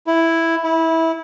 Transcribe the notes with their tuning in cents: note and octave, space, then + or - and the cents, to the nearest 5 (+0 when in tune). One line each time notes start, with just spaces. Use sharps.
E4 +0
E4 -20